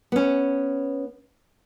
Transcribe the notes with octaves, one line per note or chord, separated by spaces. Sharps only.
B3 C#4